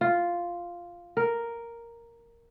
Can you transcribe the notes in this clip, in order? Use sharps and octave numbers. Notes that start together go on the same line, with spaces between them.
F4
A#4